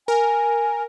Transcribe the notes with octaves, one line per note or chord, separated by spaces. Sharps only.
A#4 G#5